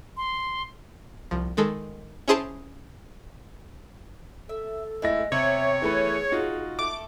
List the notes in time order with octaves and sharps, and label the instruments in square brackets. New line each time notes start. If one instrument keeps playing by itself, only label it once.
[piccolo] C6
[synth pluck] C2 F3
D#3 G#3 A4
C#4 E4 G#4 C5 A5 D7
[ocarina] A4 [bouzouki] E5
[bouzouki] G#3 [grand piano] A3 E4 A#6
[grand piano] C3 [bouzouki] B3 [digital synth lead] C#5 [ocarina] E5
[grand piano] E3 A3 B4 [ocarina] G#4
[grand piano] D#4 F4 F#4
[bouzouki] A3 [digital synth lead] D6